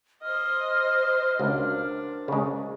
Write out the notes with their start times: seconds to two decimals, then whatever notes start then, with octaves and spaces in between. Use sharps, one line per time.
0.22 C5 D#5 F6
1.40 C#2 D4 F#4 A#4 C5
2.28 C#3 G#3